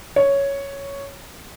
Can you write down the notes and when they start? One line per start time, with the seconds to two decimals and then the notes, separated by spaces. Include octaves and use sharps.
0.16 C#5